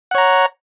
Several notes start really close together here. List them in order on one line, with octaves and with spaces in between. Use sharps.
F#5 C#5 A#5